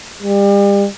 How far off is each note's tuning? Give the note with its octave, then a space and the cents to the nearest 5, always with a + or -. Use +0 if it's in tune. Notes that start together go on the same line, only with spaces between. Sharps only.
G3 +35